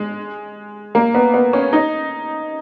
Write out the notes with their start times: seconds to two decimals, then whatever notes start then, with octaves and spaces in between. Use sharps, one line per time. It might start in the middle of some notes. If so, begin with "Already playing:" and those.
Already playing: G#3
0.95 A#3
1.14 B3
1.34 B3
1.53 C#4
1.73 D#4